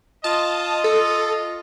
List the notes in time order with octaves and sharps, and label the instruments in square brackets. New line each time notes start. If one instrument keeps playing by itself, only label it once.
[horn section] F4 D#5 [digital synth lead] A5
[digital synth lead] A4